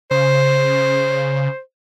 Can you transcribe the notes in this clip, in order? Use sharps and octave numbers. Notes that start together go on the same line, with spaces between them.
C#3 C5